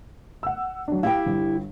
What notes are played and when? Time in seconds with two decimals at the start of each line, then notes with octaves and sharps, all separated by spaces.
0.43 F#5 E6
0.88 F#3 D4
1.03 E4 G4 F5 G5
1.26 G1